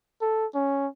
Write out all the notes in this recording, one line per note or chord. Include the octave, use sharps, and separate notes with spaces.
A4
C#4